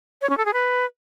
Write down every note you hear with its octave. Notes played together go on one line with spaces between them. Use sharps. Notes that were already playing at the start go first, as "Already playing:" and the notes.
C#5
C#4
A4
G#4
B4